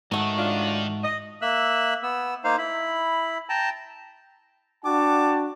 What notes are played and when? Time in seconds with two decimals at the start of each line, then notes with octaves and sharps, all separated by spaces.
0.12 G#2 D#3 F#3 A3 D#4 F#4
0.38 C#3 D4 F4
1.04 D#5
1.42 A#3 E5 E6 F#6
2.03 B3 E6
2.44 A#3 D#4 C5 F5
2.58 E4 B5
3.49 G5 A5 A#5
4.85 D4 F#4 F#5 G5 A5 D6